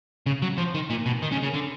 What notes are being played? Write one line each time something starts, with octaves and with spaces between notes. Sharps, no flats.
C#3
F#3
F3
D#3
A#2
B2
D#3
C#3
C#3
D3